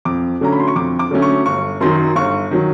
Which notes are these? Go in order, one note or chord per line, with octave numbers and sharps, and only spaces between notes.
F2 D6
D3 F#3 A3 C#4 A#5
B5
C6
C#6
F2 D6
D6
D3 F#3 A3 C#4
C#6
G1 C#6
F#2 D#3 F#3 C6
G1 C#6
D#3 F#3